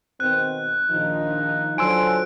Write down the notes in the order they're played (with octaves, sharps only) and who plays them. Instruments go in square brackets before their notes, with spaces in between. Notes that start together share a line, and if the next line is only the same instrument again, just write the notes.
[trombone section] B2 D#3 C4 [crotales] F#6
[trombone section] A#1 [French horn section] D#3 F3 D#4
[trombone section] D3 C5 [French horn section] F#3 F4 [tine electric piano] G#5 C6 E6 [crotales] D7